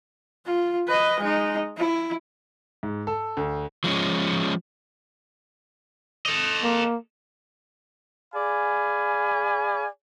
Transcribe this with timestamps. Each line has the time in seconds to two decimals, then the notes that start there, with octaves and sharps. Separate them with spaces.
0.45 F4
0.88 B4 D#5
1.20 G#3 D#4
1.77 E4
2.83 G#2
3.07 A4
3.37 D2
3.84 F3 G#3 A3 C#4
6.26 A4 D#5
6.63 A#3
8.35 G#4 D5 F5 G#5 B5